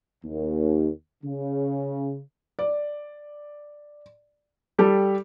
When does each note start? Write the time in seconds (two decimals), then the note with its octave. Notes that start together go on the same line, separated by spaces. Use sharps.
0.25 D#2
1.23 C#3
2.59 D5
4.78 G3 G4 A4